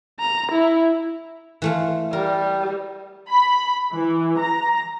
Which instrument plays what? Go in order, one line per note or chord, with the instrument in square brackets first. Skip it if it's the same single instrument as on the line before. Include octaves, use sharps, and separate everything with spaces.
[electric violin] A#5
E4
[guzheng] E3 A3 F4
[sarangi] G3 [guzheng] A#4
[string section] B5
E3
A#5